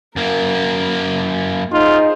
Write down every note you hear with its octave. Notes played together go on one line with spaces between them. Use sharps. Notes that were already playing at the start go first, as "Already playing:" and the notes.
F#2 A#3 A#4
D#4 F4 G#4 C5